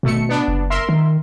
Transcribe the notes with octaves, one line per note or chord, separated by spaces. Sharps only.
G#1 B2 A3 C#7
B3 D4
F#1
A#4 E5 C6
D#3